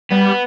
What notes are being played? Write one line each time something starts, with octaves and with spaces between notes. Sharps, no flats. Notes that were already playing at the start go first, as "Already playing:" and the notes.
G3 B3